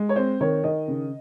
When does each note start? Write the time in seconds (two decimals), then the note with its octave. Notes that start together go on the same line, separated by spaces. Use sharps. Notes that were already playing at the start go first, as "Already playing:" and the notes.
Already playing: G#3
0.09 C#5
0.16 C4 C5
0.41 D#3 C#5
0.64 D#3 D#5
0.88 C#3